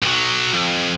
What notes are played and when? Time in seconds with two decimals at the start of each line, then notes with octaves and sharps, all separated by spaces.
0.03 B1 F#3
0.54 F2